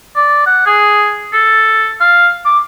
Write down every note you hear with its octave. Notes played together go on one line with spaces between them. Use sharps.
D5
F#5
G#4
A4
F5
D6